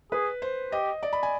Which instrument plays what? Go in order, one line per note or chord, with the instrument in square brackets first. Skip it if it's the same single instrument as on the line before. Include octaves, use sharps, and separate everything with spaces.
[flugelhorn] G#4 [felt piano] B4
[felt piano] C5
[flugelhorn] G4 [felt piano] D#5
[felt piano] D5
B5
G#5